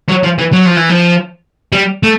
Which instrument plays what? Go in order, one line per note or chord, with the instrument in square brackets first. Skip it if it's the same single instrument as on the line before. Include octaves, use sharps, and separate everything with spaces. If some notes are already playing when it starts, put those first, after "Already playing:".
[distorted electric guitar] F#3
F3
E3
F#3
F3
E3
F3
G3
A3